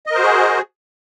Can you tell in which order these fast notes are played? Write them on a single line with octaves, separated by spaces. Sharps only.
D#5 A#4 C5 F#4 G#4